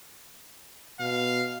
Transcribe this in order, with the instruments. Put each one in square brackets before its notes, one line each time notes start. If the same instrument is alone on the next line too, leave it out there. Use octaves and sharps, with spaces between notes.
[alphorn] B2 [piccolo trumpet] F5